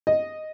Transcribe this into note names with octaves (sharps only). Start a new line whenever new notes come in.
D#5